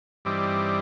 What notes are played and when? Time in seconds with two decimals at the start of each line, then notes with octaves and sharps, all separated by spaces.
0.25 G2 E3 G3 C4 D#4 D5